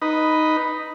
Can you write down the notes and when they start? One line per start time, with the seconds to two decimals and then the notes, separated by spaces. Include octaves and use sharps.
0.02 D#4 B4